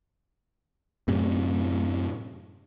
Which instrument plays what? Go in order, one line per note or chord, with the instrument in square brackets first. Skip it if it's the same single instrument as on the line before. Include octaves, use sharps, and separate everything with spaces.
[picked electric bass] F#2 A2 C3